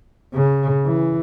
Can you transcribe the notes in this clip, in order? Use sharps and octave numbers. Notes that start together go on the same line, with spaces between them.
C#3
E3